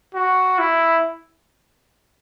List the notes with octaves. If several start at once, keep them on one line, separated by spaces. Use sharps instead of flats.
F#4
E4